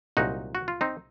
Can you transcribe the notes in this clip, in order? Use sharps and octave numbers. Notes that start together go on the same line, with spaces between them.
C2 A#2 F#3 D#4 F#4
F#4
F4
C4 D#4